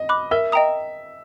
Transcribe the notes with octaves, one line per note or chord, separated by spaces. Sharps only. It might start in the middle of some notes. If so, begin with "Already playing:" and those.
Already playing: D#5
B5 D6 F#6
A#4 E5
D#5 G5 A#5 D#6